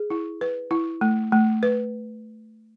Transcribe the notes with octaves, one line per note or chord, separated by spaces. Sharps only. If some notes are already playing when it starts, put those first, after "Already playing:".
Already playing: G#4
E4
B4
E4
A3
A3
B4